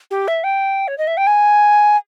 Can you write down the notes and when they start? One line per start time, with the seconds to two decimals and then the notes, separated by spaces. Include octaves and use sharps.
0.11 G4
0.28 E5
0.44 G5
0.88 C#5
0.98 D#5
1.07 E5
1.17 G5
1.27 G#5